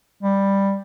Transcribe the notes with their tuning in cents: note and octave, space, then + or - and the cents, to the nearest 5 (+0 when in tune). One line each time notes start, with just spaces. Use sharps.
G3 +10